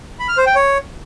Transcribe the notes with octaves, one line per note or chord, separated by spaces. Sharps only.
B5
F6
C5
G5
C#5